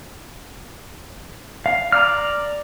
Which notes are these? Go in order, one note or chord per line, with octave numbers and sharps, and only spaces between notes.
F5
D5 A#5 F6